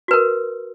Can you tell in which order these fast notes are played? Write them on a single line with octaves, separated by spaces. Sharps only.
F#4 B4 A#4